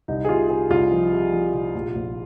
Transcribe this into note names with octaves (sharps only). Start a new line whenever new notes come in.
C2 D#4
G#4
C3 F4
C3 G#4
C2 F4
F3
C3
F3
C3
A#1
A#1